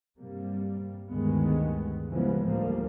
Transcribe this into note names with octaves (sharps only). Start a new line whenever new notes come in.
G2 C3 G3 A#3
D2 G2 D#3 G#3 B3
C#3 E3 F3 G3 G#3 B3
A1 D2 F3 G3 A#3